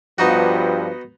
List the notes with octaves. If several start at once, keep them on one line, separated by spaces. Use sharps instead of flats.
G2 F3 B3 D#4 F#4